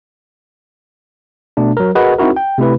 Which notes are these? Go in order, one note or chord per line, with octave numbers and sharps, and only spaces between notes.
B2 A3 D4
F#3 A#4
F#4 G#4 A#4 B4 D#5 F#5
C4 D#4 E4 F#4 A#4
G5
C3 A3 E4 B4